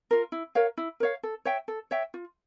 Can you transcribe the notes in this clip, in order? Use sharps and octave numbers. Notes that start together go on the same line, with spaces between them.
F4 A#4
E4
A#4 C#5 F5
E4
A#4 C#5 F5
A4
C#5 E5 G5
A4
C#5 E5 G5
F4